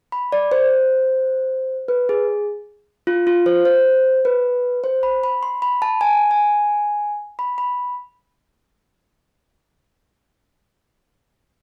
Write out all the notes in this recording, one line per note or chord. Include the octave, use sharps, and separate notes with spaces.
B5
D5
C5
B4
G#4
F4
F4
C5
C5
B4
C5
B5
B5
C6
B5
A5
G#5
G#5
B5
B5